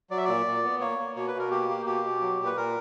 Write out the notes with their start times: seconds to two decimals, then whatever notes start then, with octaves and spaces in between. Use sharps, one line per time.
0.10 F#3 D5
0.18 E5
0.25 A#2 D5
0.46 A#2
0.63 B3
0.81 A#3 C#5
0.98 A#3
1.16 B2 C#5
1.28 B4
1.33 B2
1.39 A#4
1.51 A#3 G4
1.69 A#3
1.86 B2 G4
2.04 B2
2.21 F#3
2.39 A#2
2.46 B4
2.57 A#2 A#4